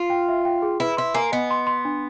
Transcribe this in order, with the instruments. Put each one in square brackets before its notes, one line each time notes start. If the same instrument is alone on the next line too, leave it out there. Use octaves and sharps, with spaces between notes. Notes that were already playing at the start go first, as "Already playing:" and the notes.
Already playing: [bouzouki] F4
[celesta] G5
E5
G5
G#4
[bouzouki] E4 [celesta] B4
[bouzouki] E4 [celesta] C6
[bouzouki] A#3 [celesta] G#5
[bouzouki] B3 [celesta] D#5
[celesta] C6
C6
D4